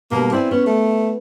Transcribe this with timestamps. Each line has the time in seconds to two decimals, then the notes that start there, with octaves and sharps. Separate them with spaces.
0.11 B2 D3 G3 A#3
0.32 C4 E4 D5 G#5
0.51 B3 C#4
0.66 A3